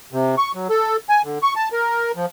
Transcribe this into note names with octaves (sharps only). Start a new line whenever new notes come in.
C3
C#6
F#3
A4
G#5
D3
C#6
A5
A#4
F3